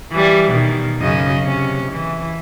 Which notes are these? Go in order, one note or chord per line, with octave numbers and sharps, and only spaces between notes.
E3 G3
B2 D#3
F#2 C#3 D#5
C3 C#4
E3